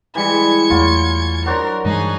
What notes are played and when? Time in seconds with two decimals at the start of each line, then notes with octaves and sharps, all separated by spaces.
0.15 E3 G3 G#3 G#6 C#7
0.70 E2 F#3 A3 F4
1.46 F#3 D4 A#4 C5
1.85 G2 E3 G#3 D#4 G#4